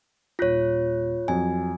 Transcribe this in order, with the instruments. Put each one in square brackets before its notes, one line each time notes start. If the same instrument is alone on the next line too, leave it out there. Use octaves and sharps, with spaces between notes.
[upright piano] D#1 F#6 A#6 [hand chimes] F4 C#5
[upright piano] F2 F#3 [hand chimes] G#5